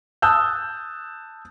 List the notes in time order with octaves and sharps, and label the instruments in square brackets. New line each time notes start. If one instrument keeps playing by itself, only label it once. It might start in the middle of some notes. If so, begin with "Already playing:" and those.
[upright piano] A5 D#6 E6 F#6 G6